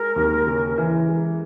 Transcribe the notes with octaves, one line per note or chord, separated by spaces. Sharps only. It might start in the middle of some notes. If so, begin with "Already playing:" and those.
Already playing: G#3 A#4
D#2
C#3
E3
G#3